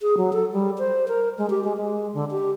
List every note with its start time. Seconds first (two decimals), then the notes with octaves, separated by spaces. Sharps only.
0.02 G#4
0.17 F#3
0.33 A4
0.53 G3
0.78 C5
1.08 A#4
1.38 G#3
1.50 G4
1.64 G#3
1.77 G#3
2.14 D3
2.31 G4